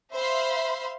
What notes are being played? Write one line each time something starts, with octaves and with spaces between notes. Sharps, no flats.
C5 E5 F5 B5 C6